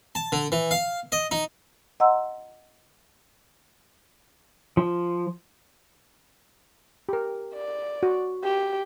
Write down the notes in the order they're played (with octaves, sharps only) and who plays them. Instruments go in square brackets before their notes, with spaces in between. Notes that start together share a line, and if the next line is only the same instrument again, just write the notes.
[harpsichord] A5
D3
E3
F5
D#5
D#4
[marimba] D#5 F#5 A#5 C6 E6
[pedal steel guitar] F3
[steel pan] G4 A#4
[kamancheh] D5
[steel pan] F#4
[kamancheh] G4